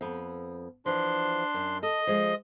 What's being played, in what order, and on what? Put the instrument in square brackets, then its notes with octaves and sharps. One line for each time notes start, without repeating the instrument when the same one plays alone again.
[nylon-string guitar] F2 B3
[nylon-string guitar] E3 F3 [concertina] D4 C6
[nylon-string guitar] F#2
[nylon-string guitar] A4 [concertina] D#5
[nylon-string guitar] F3 G#3